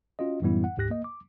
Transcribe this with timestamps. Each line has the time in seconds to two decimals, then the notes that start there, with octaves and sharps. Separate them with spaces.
0.19 C#4 F4 F#4 D#5
0.42 F#2 A2 E3 G3 B3 E4
0.64 F#5
0.77 D2 G#2 G4 F#6 A#6
0.90 A#3 D#5
1.04 D6